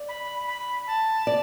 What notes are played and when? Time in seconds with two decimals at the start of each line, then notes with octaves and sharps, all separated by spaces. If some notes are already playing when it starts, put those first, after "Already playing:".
Already playing: D5
0.09 B5
0.48 B5
0.87 A5
1.27 D5